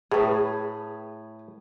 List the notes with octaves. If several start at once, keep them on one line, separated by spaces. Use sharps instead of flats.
A2 G#4 B4